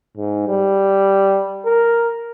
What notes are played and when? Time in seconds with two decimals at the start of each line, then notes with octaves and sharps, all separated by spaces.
0.17 G#2
0.47 G3
1.65 A#4